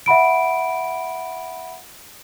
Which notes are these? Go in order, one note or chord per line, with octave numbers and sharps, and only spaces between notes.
E5 F#5 B5 D7